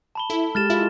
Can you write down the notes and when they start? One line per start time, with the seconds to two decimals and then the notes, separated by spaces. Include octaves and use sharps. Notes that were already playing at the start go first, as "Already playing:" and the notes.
0.15 A5 B5 G7
0.30 E4 A4
0.55 G#3 G4 F6 A6 E7
0.70 E4 F4